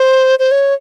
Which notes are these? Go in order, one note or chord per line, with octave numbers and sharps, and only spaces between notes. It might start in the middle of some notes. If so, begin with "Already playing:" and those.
Already playing: C5
C5
C#5